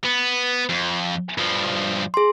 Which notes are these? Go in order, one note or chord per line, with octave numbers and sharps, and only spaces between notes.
B3
F2
G2 F3
G#4 C6